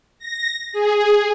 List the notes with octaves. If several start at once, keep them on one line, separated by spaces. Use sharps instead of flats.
A#6
G#4